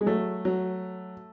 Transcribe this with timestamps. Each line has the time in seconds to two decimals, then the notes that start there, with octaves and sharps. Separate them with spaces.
0.01 G#3
0.06 F#3 A3
0.45 F#3